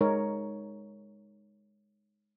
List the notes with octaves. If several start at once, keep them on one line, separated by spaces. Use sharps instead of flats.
G#3 D#4 A#4 C#5